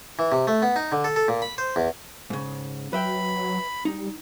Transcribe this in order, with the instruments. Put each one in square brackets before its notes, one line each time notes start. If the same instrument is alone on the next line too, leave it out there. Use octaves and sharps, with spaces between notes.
[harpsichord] E3
C3
A3
B3
D#4
D3
A4
A4
A#2
B5
C5
E2
[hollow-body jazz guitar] G#2 C#3
[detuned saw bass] F#3 [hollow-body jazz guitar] B4 E5 G5 [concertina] B5
[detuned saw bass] G3 [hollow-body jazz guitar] D#4